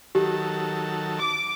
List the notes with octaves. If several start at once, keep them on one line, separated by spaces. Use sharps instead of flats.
D#3 F#3 G4 A4
D6